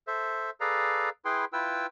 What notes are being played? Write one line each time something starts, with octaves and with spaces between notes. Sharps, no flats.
A4 C5 E5
G#4 A4 B4 D5 F5 A#5
E4 G#4 B4 G5 C6
E4 F4 B4 G5 E6